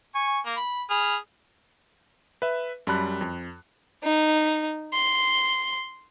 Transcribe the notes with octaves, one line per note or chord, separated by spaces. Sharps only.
G#5 C#6
A#3
B5
G#4 B5 F6
B4 E5
F#2 G3 A5 B5 F#6
F2
D#4
C6